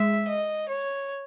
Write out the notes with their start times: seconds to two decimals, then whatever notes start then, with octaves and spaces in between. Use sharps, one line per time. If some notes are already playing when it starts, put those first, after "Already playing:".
Already playing: G#3 E5
0.28 D#5
0.68 C#5